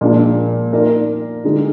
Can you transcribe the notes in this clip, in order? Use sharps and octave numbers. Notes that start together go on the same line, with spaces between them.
A#2 F3 G#3 D4
A#3 D#4 A#4 D5
D3 G#3 D#4